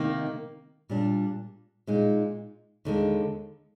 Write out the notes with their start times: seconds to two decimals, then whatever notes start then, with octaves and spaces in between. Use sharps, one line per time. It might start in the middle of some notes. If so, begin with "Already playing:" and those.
Already playing: C3 D#3 A#3 D#4
0.89 A#2 G3 D4
1.87 A#2 G#3 D#4
2.85 D#2 D3 G#3